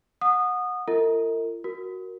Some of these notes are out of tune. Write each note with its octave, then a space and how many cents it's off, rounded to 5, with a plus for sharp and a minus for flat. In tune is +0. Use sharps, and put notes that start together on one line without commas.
F#5 -25 D#6 -20
F4 -40 A#4 -45 D#5 +40
F#4 +0 A#4 +0